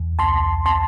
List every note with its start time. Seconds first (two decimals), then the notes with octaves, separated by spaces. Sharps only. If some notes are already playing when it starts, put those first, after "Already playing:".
Already playing: E2
0.19 C2 A5 C6
0.66 A5 C6